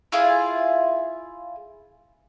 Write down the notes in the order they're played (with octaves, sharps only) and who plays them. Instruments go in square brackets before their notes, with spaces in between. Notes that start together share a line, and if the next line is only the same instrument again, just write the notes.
[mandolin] E4 F4 G#4